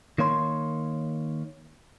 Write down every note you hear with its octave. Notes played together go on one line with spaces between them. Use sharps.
D#3 A#3 C#5 C6